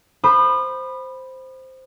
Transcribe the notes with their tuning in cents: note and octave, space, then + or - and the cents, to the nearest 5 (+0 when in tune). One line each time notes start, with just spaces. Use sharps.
C5 +0 B5 +0 D#6 -40